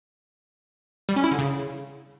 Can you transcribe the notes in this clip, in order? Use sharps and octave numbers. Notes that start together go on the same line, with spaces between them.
G3
C#4
E4
D3
C#3